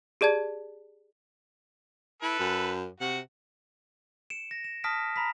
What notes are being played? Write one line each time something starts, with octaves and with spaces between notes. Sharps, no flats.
G4 G#4 D5 A5 G#6
E4 A4 B4
F#2
C3 F#4 F#5
C#7 D7 E7
A#6
E7
A5 D#6 F6 A#6 B6 D7
A#5 B5 B6